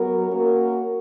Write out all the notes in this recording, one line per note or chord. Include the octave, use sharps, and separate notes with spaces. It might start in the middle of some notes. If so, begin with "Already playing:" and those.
Already playing: F#3 B3 F#4 A#4
A#3 C#4 F#4 A#4